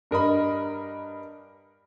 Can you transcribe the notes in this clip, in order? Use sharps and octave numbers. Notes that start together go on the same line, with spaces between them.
G2 A#4 D#5 B5